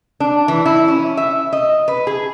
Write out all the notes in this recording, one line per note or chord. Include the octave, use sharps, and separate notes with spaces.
D4
E3
E4
C#4
E5
D#5
B4
G#4